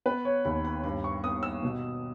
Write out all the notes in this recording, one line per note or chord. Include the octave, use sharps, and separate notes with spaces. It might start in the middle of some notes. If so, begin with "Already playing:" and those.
B3 B4
C#5
D#2 B5
B5
G2 B5
C#6
B3 D#6
E6
B2